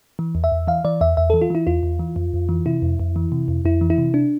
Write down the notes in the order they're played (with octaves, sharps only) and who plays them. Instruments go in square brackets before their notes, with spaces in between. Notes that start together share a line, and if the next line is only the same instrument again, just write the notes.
[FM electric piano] E3
E2
E5
E2
E3 F5
E3 D5
E2 E5
E2 E5
E3 A4
F4
E3 E4
E2 F4
E2
E3
F2
F2
E3
C3 E4
F2
F2
E3
C3
F2
F2 E4
E3
E4
C3
D4